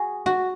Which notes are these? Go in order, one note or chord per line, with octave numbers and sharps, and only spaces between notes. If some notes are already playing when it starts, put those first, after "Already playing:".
Already playing: F#4 G#4
F#4